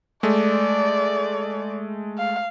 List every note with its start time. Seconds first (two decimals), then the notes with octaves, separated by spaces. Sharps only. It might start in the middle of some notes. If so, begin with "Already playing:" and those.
0.23 G#3 A3 D5
2.18 F5